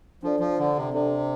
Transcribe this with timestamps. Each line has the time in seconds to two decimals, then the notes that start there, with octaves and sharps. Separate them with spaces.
0.23 F3 D4 A4 D5
0.40 F3
0.59 D3
0.76 C3
0.94 C3 D4 A4 D5